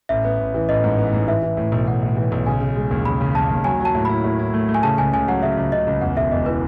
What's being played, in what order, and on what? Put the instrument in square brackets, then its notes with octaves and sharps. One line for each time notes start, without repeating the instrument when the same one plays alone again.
[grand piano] A1 [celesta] E5
[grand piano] B3
A1
E3
[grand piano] A1 [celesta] D#5
[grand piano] G#2
B3
G#2
[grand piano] E3 [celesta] E5
[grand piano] E3
A2
B1
[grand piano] B1 [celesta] F#5
[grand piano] A2
E3
B1
[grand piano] C#3 [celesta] G#5
[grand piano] C#3
G#3
D#2
[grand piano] C#3 [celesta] B5
[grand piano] C#3
[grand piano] D#2 [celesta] A5
[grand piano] D#2
[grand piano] F#3 [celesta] G#5
[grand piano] F#3
[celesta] A5
[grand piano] A2
[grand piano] E4 [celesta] B5
[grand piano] A2
E4
A3
A3
[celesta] G#5
[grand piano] C#3 [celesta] A5
[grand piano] C#2 [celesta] G#5
[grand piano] C#2 [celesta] G#5
[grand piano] F#3 [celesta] F#5
[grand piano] C#3 [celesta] E5
[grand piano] C#2
[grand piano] C#3 [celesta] D#5
[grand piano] C#2
[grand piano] E2 [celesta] F#5
[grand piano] E1 [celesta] E5
[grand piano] E2 [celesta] D#5
[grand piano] E3 [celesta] B4